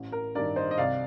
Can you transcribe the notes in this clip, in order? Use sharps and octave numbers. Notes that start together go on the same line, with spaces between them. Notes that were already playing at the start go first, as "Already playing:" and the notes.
Already playing: A1
A#4
G2 D#3 A#4 D5
C5 D#5
D#5
C2 D5 F5